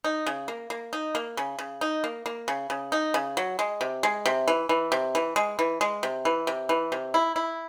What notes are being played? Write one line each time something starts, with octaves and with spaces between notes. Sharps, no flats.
D#4
C#3
A#3
A#3
D#4
A#3
C#3
C#3
D#4
A#3
A#3
C#3
C#3
D#4
C#3
F#3
G#3
C3
G#3
C3
E3
E3
C3
E3
G#3
E3
G#3
C3
E3
C3
E3
C3
E4
E4